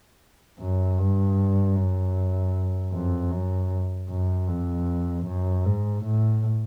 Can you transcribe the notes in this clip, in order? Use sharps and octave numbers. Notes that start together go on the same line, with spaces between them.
F#2
G2
F#2
F2
F#2
F#2
F2
F#2
G#2
A2